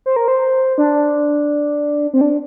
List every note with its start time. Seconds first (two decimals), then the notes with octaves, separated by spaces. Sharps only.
0.06 C5
0.16 A#4
0.28 C5
0.78 D4
2.13 C4
2.21 D4